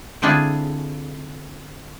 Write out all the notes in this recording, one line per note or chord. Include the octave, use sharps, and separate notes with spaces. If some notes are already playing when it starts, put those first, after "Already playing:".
D3 C4 D4 E4 F4 G#4